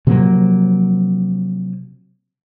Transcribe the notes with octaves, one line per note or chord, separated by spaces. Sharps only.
C3 F3 F#3 A#3